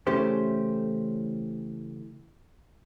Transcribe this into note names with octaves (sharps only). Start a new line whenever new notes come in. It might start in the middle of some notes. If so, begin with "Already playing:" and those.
C#3 E3 A3 C#4 G4 C5